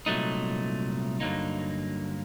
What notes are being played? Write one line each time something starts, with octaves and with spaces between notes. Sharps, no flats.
C2 A#2 F#3 A3 D#4
G2 D3 F#3 A#3 D#4